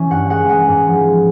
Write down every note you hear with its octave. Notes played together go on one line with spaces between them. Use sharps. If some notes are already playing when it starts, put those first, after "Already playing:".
Already playing: E3 C#4
G2 F#5
G#3 F#5
G#3 F#5
G#2
F3